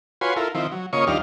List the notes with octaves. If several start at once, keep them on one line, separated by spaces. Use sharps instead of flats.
F4 F#4 B4 C#5 G#5 C6
E4 F4 A4 A#4
D#3 F3 C4 E4
F#3
C#3 A#3 F4 C#5 D#5 C#6
D#2 F3 G3 D4 D#4 F6